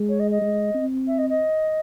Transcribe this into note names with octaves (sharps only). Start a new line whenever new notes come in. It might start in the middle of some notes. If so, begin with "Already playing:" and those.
Already playing: G#3
C#5
D#5
D#5
G#3
C4
E5
D#5
D#5